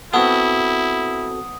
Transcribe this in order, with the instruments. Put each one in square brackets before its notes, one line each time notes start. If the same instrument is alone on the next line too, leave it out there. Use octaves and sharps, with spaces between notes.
[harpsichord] B3 [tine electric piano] C4 F#4 A4 [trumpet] E4 [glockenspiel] D#6